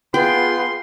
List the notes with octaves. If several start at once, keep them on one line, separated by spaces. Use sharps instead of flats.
B3 F4 G#4 G5 C6